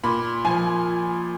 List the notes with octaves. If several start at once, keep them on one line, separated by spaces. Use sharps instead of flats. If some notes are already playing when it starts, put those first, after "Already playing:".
A#2 B5
F3 G#5